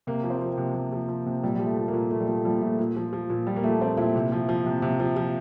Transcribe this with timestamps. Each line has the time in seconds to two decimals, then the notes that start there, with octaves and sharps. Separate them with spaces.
0.07 C3 A#3
0.24 F3
0.30 C4
0.41 F3
0.52 A#3
0.58 C3
0.75 C3
0.93 F3
1.09 F3
1.26 C3
1.43 A#2 G3
1.55 F3 G3
1.66 A3
1.76 F3
1.88 A#3
1.94 A#2
2.10 A#2 A3
2.20 G3
2.28 F3 A3
2.45 F3 G3
2.62 A#2 A3
2.79 A#2
2.96 F3
3.13 F3
3.30 A#2
3.47 A#2 G3
3.56 A#3
3.64 F3 A3
3.81 F3 C4
3.97 A#2 E4
4.15 C3
4.32 F3
4.49 F3
4.66 C3
4.82 C3
5.00 F3
5.17 F3